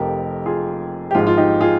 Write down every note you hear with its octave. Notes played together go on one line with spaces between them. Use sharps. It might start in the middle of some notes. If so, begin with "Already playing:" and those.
Already playing: F1 F2 C3 F3 G4 A#4
F4 G#4
G4
G#1 G#2 F3 G#3 F4
F4
D#4 G4
F4 G#4